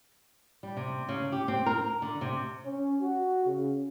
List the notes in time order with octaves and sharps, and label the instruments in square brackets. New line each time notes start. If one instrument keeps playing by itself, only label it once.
[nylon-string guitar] G3
C3
C#3
G4
C4
A#4
D3
C3
[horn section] C#4
F#4
C#3